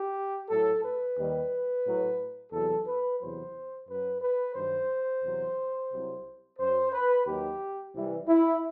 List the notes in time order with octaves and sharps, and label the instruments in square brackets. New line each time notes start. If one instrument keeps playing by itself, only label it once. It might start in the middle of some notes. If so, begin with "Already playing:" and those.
Already playing: [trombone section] G4
A2 F#3 A4
B4
D#2 D#3 G3
A2 F#3
E2 C3 F#3 A4
B4
E2 C3 F#3 C5
F#2 F#3 B4
B4
G2 D#3 F#3 C5
E2 C3 F#3
C2 C3 F#3
F#2 F#3 C5
B4
D#2 D#3 F#3 G4
C2 C3 E3 G3
E4